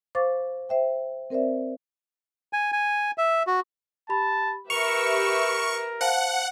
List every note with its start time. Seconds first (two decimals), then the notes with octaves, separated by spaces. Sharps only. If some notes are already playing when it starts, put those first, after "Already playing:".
0.15 C5 F5 C#6 D6 A6
0.69 C5 E5 G5
1.30 C4 A#4 C5 D5 E5
2.53 G#5
2.72 G#5
3.18 E5
3.47 F#4
4.09 G4 A5 B5
4.70 G4 A#4 B4 E5 C#6 F7
6.01 C5 F5 F#5 A5